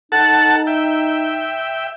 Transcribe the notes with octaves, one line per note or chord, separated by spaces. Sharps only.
D#4 A4 F#5 A5
E5 G5